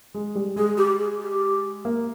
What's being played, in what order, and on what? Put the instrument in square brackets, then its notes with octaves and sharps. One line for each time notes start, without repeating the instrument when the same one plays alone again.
[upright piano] G#3
G3
[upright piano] G#3 [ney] G#4
[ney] G4
G#4
G4
[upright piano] A#3